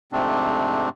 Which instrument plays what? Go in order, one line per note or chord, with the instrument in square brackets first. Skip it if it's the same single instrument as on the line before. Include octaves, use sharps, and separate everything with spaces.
[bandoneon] F2 G#2 C3 A3 C4 D4